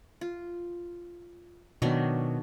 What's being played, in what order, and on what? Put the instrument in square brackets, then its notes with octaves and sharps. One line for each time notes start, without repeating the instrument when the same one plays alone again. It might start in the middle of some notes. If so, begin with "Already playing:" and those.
[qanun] F4
[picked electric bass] B2 B3 [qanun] D#3 F#3 D4